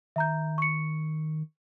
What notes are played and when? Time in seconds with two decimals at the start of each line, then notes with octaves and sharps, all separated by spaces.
0.16 D#3 E5 A#5 G6
0.58 C#6 C#7